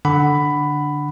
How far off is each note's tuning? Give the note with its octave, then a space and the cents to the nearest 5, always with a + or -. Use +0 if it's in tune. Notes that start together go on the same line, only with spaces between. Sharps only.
D3 +0 F#5 +10 B5 +10